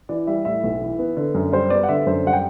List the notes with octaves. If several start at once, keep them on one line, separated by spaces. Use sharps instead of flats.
E3 D5
G3 E5
A2 E5
B1
E3
B3
D3
F#2
G3 C5
B3 D5
F#5
D3 E5
F#2 C5
G3 F#5
G5